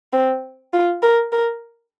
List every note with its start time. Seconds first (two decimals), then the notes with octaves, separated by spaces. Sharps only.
0.13 C4
0.73 F4
1.02 A#4
1.32 A#4